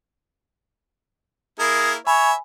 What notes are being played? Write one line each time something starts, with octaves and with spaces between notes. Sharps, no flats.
A#3 E4 G#4 A#4
C#5 E5 G#5 B5